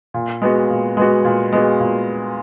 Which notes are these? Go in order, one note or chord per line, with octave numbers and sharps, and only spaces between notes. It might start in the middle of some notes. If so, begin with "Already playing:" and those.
A#2
G#3 B3 F#4
A#2
G#3 B3 F#4
A#2
G#3 B3 F#4
A#2